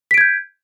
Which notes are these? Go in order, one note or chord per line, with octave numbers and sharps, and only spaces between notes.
G6 G#6 B6 D7